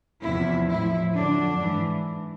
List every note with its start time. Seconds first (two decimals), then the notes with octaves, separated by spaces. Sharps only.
0.23 E2 C3 F3 E4
0.68 A2 F3 E4
1.13 F2 D3 F#3 D4
1.57 G#2 E3